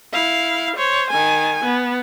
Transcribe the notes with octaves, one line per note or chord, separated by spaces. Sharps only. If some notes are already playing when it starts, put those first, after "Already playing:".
E4 F5
C5 C#5
D#3 G#5
B3